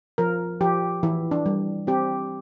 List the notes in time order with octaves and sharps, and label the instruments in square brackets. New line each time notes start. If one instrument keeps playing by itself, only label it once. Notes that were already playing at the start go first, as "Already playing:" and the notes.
[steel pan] F3 A#4
F3 G4
E3 E4
D4
G3
C4 G4